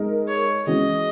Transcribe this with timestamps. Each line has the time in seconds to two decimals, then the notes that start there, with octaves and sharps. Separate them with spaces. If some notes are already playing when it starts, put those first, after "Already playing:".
Already playing: G#3 D#4 A#4
0.28 C#5
0.67 E3 G#3 C#4 F#4 D#5